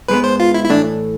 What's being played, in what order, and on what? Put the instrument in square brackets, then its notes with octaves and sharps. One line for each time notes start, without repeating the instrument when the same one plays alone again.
[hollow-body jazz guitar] G#2 G#3 B3 [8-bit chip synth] B4
[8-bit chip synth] C5
F4
E4
E4
[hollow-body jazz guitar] A2 E3 A3 [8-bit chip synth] D4